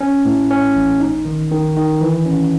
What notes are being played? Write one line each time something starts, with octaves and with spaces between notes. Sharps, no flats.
C#4
A2
C#4
A1
D#4
D#3
D#3
D#3
E3
C#4